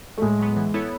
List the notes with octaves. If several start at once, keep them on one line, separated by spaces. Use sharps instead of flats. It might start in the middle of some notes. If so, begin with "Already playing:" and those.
A3
A2 G#3
F#3 B3
E3
B3 E4 A4 C#5